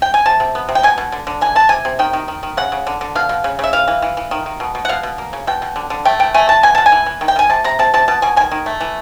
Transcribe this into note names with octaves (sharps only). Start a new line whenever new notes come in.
G5
G#5
C3 A5
C3
B3
C3
G5
B2 G#5
B2
D3
D3
E3 G#5
E3 A5
C3 G#5
C3
D#3 G5
D#3
D#3
D#3
C#3 F#5
C#3
D3
D3
B2 F5
B2
C#3
C#3 E5
E3 F5
E3
E3
E3
D#3
D#3
B2
B2
F#5
B2 F5
B2
A#3
C#3
B2 G5
B2
D3
D3
A3 G5
E3 G5
A3 G#5
E3 A5
B2 G#5
B2 A5
G#5
E3
E3
D#3
G5
D#3 G#5
C3 A5
C3 A#5
C3 A5
C3 A5
B2 A5
B2 G#5
D#3 G#5
D#3
A3
E3